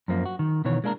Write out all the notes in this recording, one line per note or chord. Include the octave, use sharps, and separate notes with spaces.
F#2 F3 A#3
F#4
D#3
B2 D#3 E3 C#5
G#3 A#3 D4 A4 A#4